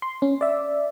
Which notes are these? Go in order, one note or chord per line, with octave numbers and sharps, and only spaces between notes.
C6
C#4
D5 E5